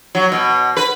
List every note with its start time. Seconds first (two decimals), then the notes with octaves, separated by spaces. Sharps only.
0.15 F#3
0.32 B2
0.77 B4